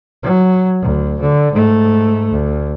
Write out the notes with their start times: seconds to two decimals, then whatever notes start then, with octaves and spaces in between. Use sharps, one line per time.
0.23 F#3
0.82 D2
1.20 D3
1.53 G#2 A3
2.31 D2